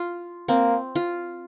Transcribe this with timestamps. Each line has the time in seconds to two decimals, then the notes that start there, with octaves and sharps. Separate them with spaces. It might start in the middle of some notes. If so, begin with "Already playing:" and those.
Already playing: F4
0.48 A#3 C4
0.95 F4